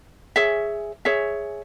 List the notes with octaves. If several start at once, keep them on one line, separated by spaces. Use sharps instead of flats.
G#4 C#5 E5
G#4 C#5 E5